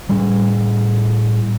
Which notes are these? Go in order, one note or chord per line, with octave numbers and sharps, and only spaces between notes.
A2 G3